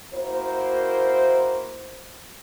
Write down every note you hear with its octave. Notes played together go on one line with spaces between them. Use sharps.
A#3 E4 F#4 A#4 C5